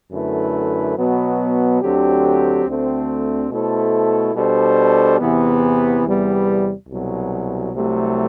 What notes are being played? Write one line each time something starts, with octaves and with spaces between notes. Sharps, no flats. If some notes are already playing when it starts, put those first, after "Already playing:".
F#2 D3 A3 E4 B4
B2 F#3 B3
D2 D3 F#3 C4 G4
D2 D3 A3 C4
B2 A3 E4 A4 C5
B2 G3 D4 A4 C5
E2 C3 E3 B3
E2 C3 G3 B3
C2 B2 F#3
C2 C3 F#3 A3